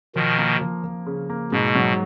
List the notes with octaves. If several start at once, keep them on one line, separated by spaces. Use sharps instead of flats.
B2 D#3 F3
A#3
F3
F3
C#3
A#3
G#2 B2
F#3